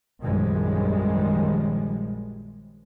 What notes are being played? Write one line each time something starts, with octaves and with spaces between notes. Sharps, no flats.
A#1 F#2 D#3 F3 G3 G#3